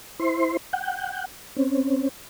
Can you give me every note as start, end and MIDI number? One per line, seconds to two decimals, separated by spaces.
0.19 0.57 64
0.19 0.57 72
0.19 0.57 84
0.73 1.26 78
0.73 1.26 79
1.57 2.09 60
1.57 2.09 61